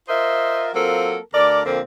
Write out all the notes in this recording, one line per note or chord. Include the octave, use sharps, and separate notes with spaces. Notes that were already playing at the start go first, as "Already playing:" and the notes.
F4 A#4 C5 D#5 E5
F#3 A#3 C4 F4 A4 A#4
D2 A4 A#4 D5
F2 A#2 D3 A#3 C4